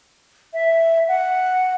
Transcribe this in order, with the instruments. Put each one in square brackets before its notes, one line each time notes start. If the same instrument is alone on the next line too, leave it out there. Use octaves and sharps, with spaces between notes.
[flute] E5
F#5